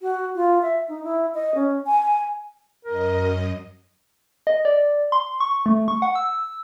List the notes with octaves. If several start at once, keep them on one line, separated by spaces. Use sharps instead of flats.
F#4
F4
E5
D#4
E4
D#5
C#4
G#5
F#2 A#4 D#5
D#5
D5
C6
C#6
A3
C#6
F#5
E6